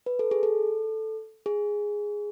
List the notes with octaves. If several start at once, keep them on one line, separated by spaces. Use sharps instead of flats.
B4
A4
G#4
A4
G#4